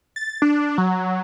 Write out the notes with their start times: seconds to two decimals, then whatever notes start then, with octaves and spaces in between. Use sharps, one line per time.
0.16 A6
0.42 D4
0.78 F#3